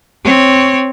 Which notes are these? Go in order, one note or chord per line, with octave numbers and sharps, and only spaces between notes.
C4 C#5